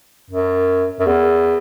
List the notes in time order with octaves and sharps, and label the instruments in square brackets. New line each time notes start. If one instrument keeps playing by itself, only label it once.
[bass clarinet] F#2
F#2
E2